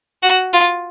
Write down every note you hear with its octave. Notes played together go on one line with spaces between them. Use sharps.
F#4
F4